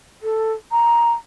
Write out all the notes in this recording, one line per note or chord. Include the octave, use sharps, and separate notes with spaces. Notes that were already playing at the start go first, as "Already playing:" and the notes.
A4
A#5